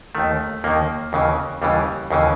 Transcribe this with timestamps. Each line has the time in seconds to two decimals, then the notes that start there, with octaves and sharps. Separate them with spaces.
0.15 D#2 D#3 A3
0.64 D#2 D#3 A#3
1.13 D#2 C#3 E3
1.62 D#2 C#3 E3 G3
2.11 D#2 C#3 E3